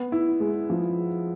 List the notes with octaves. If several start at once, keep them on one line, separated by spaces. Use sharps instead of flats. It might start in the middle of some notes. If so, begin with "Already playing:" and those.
Already playing: B3
E4
G#3
F3